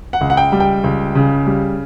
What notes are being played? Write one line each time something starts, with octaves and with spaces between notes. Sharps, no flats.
F#5
C#2
F#5
G5
G3
G5
C#2
C#3
G3